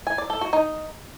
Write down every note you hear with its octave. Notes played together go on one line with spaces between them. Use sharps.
G#5
D5
A4
F#4
D#4